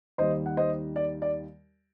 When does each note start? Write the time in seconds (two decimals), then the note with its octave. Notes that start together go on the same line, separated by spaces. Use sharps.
0.18 D#2 D#3 G3 C5 D#5
0.46 F#5
0.57 C5 D#5
0.96 D5
1.22 D5